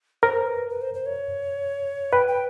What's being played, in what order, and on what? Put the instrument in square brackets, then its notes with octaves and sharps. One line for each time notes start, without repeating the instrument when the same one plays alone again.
[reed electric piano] A#4 [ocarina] C5
[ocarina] B4
B4
C5
C5
C#5
[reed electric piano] B4 [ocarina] G5
[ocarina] G5